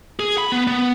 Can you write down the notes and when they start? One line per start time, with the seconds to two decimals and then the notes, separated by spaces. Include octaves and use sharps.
0.20 G#4
0.38 B5
0.52 B3
0.67 B3